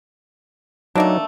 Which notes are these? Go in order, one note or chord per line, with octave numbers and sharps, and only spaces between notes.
F#3 A3 A#3 D4 D#4